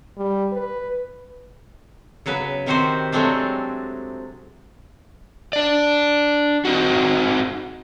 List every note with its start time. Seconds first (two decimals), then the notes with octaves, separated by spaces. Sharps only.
0.17 G3
0.52 B4
2.26 C#3 F#3 B3 B4
2.66 C3 D#3 C4 F#4 G4 C5
3.12 C3 F#3 G#3 A3 C4 D4
5.53 D4 D5
6.65 C4 D#4 F#4